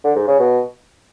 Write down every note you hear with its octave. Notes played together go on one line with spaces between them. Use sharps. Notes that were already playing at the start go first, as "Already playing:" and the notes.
D3
G#2
C#3
B2